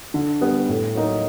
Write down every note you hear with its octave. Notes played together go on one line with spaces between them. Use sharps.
D3
G3 B3
A2
F#3 A#3 D#4